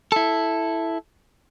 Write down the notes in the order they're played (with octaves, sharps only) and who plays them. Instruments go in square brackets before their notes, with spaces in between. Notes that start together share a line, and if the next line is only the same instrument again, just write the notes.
[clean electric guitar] E4 A4